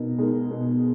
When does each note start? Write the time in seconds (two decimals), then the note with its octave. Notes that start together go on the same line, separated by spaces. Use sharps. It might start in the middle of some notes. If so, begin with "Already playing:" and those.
Already playing: B2 D#4 A#4
0.18 G#3 D#4 A#4
0.51 B2